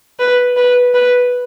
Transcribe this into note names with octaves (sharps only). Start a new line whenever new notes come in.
B4
B4
B4